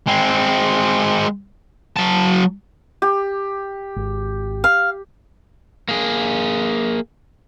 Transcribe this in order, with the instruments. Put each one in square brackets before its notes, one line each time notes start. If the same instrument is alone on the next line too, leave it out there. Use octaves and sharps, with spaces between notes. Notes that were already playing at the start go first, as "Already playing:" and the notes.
[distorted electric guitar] G#3 C4
F#3 A5
[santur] G4
[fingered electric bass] G#1
[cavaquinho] F5
[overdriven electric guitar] A#3 G#4